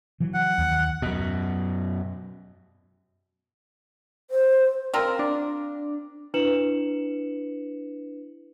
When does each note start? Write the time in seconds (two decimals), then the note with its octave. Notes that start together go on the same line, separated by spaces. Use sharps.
0.20 E3 F#3
0.34 F#5
0.58 D#2
1.02 F#2 B2
4.31 C5
4.94 C4 F4 A#4
5.19 D4
6.34 D4 E4 B4 C#7 E7 F#7